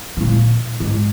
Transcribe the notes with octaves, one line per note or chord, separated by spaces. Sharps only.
C3
A#2
G#2